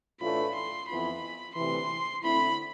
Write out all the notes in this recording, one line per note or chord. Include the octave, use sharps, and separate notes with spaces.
A2 E3 A3 D4 F4 B5
C6
F2 E3 B3 F4 B5
D2 C3 E3 C6
D3 A3 C4 E4 B5